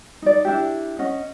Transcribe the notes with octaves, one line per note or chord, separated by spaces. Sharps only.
D#4 D5
D4 E4 G4
C#4 D#5 F#5